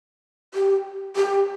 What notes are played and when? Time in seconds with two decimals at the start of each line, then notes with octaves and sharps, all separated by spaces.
0.54 G4
1.16 G4